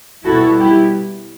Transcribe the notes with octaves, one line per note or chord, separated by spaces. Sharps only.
B2 G3 B3 E4 F#4 A4
E4 G4